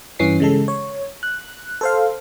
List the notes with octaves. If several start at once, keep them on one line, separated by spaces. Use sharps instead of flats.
G2 E3 C#4 C7
C#3 G#3 A4
C#5
F#6
A4 C5 F5